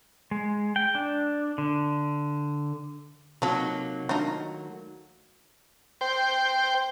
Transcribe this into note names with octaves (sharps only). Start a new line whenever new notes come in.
G#3
G5
D4
D3
C3 F#3 A#3 D#4 F4 A4
D#3 A3 D4 D#4 F4 F#4
C5 G5